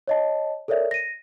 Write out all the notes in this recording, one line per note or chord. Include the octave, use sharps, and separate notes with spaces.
C#5 D#5 A5
A4 A#4 C#5 D5 E5
A#6 D#7